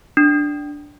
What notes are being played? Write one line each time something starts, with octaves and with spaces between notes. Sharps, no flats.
D4